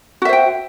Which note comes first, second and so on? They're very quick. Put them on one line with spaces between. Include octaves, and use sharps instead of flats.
F#4 E5 C5 G5